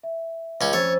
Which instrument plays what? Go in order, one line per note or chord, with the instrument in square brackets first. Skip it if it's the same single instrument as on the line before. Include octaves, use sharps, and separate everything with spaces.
[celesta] E5
[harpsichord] C#2 C#4
[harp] F2 C#4 [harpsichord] C#5 [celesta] E6 A6